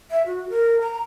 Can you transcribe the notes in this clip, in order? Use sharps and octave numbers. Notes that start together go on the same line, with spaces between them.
E5
F#4
A#4
A#5